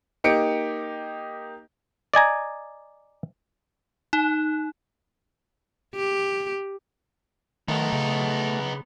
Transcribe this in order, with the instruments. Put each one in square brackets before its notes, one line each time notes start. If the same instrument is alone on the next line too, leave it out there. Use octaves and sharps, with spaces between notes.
[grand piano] A#3 D#4 G4 C#7 D7
[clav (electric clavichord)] D5 D#5 G#5 A#5
[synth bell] D#4
[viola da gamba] G4
[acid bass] D#3 [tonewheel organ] A3 [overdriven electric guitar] B3 D#4
[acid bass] C#3